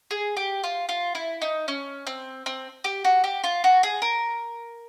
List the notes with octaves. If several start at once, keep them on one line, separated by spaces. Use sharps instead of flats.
G#4
G4
F4
F4
E4
D#4
C#4
C4
C4
G4
F#4
G4
F4
F#4
G#4
A#4